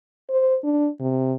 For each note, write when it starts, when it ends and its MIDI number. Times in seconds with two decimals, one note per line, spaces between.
0.29 0.57 72
0.63 0.89 62
1.00 1.34 48